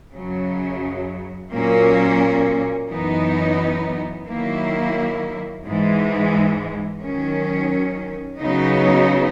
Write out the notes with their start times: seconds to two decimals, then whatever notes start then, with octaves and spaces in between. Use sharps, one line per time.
0.15 F#2 C#3 F#3
1.52 A#2 F#3 A#3 C#4
2.90 F#2 E3 B3 D#4
4.27 D#3 F#3 A#3 E4
5.65 G#2 E3 G#3
7.01 D#3 F#3 C#4
8.39 C#3 F#3 B3 D#4